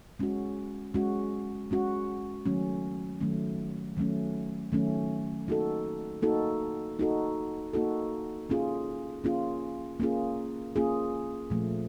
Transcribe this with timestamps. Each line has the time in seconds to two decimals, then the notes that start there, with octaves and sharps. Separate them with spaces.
0.19 G#3 C#4 F#4
0.94 G#3 C#4 F#4
1.71 G#3 C#4 F#4
2.46 D#3 F#3 A3 C#4
3.21 D#3 F#3 A3 C#4
3.97 D#3 F#3 A3 C#4
4.72 D#3 F#3 A3 C#4
5.48 A#3 D#4 F#4 A4
6.22 A#3 D#4 F#4 A4
6.99 A#3 D#4 F#4 A4
7.73 A#3 D#4 F#4 A4
8.50 A#3 C#4 F4 G#4
9.24 A#3 C#4 F4 G#4
10.00 A#3 C#4 F4 G#4
10.76 A#3 C#4 F4 G#4
11.50 A#2 F3 A3